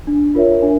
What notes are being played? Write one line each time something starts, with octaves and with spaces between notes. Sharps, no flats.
D4
F4 A#4 C#5 E5
D4